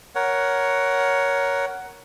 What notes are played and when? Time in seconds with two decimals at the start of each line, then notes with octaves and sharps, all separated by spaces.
0.15 A#4 C#5 F#5